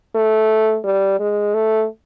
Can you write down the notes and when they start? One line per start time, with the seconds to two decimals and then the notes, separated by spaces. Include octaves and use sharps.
0.15 A3
0.84 G3
1.20 G#3
1.54 A3